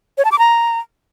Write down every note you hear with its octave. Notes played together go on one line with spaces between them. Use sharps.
C#5
A5
D6
A#5